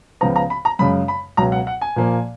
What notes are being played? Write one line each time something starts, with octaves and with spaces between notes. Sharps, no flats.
C#2 C#3 F3 B3 A#5
A#5
B5
A#5
F#2 C#3 G#3 B5
B5
C#2 B2 F#3 A#5
F#5
F#5
G#5
A#2 F3 A#3